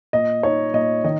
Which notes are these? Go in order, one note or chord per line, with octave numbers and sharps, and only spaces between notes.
A#2 D#5
D#4 C#5
A#2 D#5
D#3 D#5